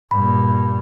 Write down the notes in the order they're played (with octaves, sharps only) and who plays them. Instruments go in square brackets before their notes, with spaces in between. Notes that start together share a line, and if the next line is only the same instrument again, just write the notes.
[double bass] G2 A#2 [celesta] B5